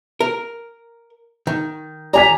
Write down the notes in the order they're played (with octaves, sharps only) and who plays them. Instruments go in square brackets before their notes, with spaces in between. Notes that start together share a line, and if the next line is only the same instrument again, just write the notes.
[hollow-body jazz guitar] A#4
D#3
[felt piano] D5 G#5 B6 [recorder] A#5